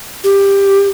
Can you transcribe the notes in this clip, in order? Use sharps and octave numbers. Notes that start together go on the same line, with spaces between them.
G4